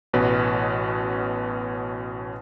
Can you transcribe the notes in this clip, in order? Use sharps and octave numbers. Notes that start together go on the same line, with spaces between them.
A1 B2 C#4 B4